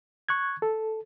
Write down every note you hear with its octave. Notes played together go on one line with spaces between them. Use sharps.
C#6 F#6 G#6
A4